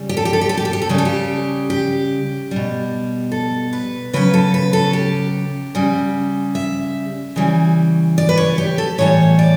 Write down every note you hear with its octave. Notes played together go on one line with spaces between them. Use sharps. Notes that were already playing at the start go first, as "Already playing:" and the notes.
Already playing: C#3 G3
G4
A4
G4
A4
G4
A4
G4
A4
G4
A4
C#3 G3 G4
A4
G4
G4
B2 G3
A4
B4
C#3 F#3 B4
A4
B4
A4
G4
C#3 G3
E5
C#3 E3 G3
D5
B4
C#5
G4
A4
A2 E3 G3 C#5
D5